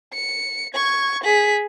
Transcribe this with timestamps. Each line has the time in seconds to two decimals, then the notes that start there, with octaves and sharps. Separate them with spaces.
0.13 C#7
0.74 C#6 G#6
1.24 G#4 B6